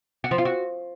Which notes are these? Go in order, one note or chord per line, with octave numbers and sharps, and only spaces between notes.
F#4
F3
F4
F#4